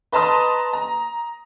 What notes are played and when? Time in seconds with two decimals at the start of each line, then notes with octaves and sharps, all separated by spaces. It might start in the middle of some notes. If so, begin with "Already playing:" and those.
0.12 B4 D#5 A5 A#5 C6 D#6
0.73 A#5